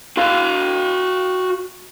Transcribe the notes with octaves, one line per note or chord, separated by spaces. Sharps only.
F#4 F5